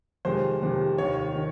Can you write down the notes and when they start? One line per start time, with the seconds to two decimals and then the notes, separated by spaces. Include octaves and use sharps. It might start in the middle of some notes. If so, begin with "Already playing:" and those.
0.25 F2 C3 D#3 G#3 C5
0.62 F2 C3 D#3 G#3
0.98 F1 D#2 D#3 C#5
1.35 D#3